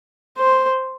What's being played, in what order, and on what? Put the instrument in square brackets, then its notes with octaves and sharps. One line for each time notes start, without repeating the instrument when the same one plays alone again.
[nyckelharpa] C5